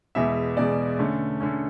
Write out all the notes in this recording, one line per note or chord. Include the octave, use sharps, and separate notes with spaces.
E2 B2 G#3 E5
E2 B2 G#3 D5
D3 A3 C#4
D3 A3 C#4